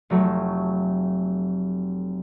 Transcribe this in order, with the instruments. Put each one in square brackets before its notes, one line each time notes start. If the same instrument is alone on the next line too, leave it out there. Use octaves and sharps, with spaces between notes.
[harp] F1 F#3 A3